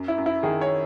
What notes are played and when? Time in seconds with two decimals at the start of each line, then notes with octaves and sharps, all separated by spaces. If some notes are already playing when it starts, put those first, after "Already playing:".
Already playing: F#2
0.08 E4
0.18 F#2
0.26 E4
0.43 D#3 G#4
0.61 C#5